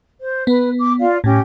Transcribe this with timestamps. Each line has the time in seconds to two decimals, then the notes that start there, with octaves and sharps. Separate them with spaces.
0.20 C5
0.47 B3 B4
0.78 D6
0.99 F4 D5 F5
1.24 A2 C#4 G4 G5